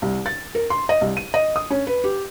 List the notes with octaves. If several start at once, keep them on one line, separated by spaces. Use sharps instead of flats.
C2
A6
A#4
C6
D#5
C2
D#7
D#5
D#6
C#4
B4
G4